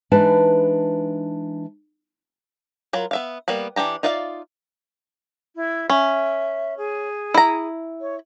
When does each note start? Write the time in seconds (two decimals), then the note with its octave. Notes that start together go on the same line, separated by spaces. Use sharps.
0.11 E3 G#3 D4 D#4 B4 A5
2.93 F#3 F4 A#4 B5
3.11 B3 E5 F5
3.48 G3 A#3 B3 B5
3.76 E3 D4 G4 A#5
4.03 D#4 F4 D5 E5 F5
5.55 E4
5.89 C#4 E5
6.77 G#4
7.34 E4 A#5
8.01 C#5